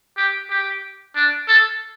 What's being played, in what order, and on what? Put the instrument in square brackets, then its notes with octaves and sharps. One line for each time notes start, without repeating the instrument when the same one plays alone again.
[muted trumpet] G4
G4
D4
A4